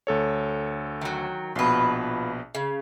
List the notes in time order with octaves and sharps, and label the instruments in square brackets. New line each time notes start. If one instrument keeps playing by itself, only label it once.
[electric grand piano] D2 A4 C#5
[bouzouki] D#3 F#3
[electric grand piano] A#1 B2 [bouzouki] F4 B4
[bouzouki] C#3